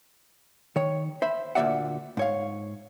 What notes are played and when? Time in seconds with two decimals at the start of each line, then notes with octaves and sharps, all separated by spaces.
0.76 D#3 C#5
1.22 C5 E5 B5
1.55 D2 A#2 B3 D5 E5 F#5
2.17 G#2 C#5 F5